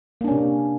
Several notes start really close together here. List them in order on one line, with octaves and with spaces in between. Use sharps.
A#3 D4 C#4 C3